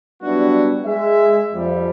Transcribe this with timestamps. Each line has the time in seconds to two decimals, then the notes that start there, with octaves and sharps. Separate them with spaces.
0.22 F#3 G3 B3 D4 E4 F#4
0.85 G#3 E5
1.53 F2 F3 G3